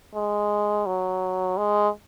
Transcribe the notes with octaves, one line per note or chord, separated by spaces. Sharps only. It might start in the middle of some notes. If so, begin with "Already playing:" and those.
G#3
F#3
G#3